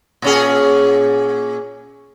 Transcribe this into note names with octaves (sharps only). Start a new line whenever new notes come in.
A#2 C#4 G#4